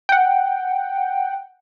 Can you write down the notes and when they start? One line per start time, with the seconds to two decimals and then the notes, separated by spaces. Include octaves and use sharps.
0.09 F#5 G5